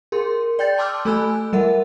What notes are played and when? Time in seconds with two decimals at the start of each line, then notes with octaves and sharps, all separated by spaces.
0.12 G#4 A#4 C6
0.59 D5 G5 G6 A6
0.78 A5 C6 D6 E6 F6 G6
1.05 A3 A4 G#5 B5 E6 F#6
1.53 G3 A#4 E5 F#5